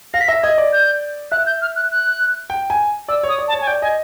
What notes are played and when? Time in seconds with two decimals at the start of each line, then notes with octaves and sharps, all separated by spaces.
0.14 F5 A#6
0.21 B6
0.28 E5 A#6
0.43 D#5 G#6
0.58 D5
0.73 G6
1.31 E5 F#6
1.46 G6
1.62 F6
1.76 F#6
1.91 F#6
2.50 G5
2.70 G#5
3.08 D5 E6
3.23 C#5
3.29 D#6
3.38 D5
3.48 A5
3.53 C#5
3.61 G#5
3.67 D5 G5
3.82 D#5 G#5